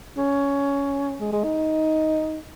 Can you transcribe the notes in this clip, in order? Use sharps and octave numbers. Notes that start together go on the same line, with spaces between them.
C#4
G#3
G#3
D#4